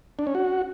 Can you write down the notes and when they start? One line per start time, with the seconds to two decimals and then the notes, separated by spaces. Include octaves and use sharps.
0.19 D4
0.27 C#4
0.35 F#4